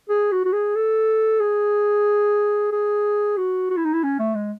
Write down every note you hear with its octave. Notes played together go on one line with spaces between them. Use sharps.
G#4
F#4
F#4
G#4
A4
G#4
G#4
F#4
F#4
E4
D#4
E4
C#4
A3
G#3